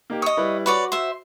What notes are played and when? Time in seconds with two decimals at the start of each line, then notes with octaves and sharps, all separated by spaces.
0.10 A#3 D#4 G4
0.22 C#5 D#5 D#6
0.37 G3 E4 B4
0.66 F#4 B4 C#5 D5
0.92 C5 E5